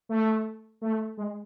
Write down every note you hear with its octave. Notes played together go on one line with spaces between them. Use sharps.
A3
A3
G#3